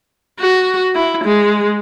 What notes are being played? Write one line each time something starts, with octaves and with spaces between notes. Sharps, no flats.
F#4
E4
G#3